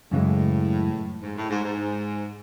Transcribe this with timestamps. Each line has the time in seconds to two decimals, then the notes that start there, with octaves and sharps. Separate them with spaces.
0.11 F#2 A2 C#3 E3 G#3
1.23 G#2
1.37 A2
1.50 G#2
1.65 G#2